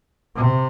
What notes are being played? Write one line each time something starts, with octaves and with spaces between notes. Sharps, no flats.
C3